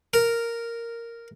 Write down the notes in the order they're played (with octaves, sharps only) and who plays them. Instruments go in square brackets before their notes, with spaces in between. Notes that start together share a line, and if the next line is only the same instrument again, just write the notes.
[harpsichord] A#4